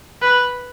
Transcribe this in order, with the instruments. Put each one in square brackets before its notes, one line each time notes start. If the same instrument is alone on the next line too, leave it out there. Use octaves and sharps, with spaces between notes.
[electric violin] B4